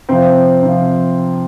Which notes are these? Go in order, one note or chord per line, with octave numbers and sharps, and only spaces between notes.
C3 F3 C4
C3 F3